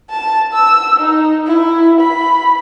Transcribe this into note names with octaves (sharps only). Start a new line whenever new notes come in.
A5
E6
D#4
E4
B5